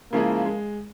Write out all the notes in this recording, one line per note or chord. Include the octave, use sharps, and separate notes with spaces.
C#3 F3 G#3 A#3 E4 G#4
G#3